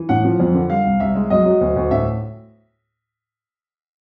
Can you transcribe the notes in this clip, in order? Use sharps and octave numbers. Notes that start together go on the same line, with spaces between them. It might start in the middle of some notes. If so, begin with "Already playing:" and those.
Already playing: E3
A2 F#5
F3
F2
D3
G3 F5
C2
C2 E5
G#3
F#2 D#5
F#3
D2
D2
A2 E5